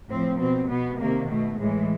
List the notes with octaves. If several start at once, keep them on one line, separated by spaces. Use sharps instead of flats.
A2 F3 C4
B2 C4
B2 B3
C3 D#3 A#3
B2 A3
A2 E3 G#3